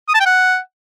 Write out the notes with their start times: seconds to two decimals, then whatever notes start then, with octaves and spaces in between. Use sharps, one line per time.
0.09 D#6
0.14 A5
0.20 G5
0.26 F#5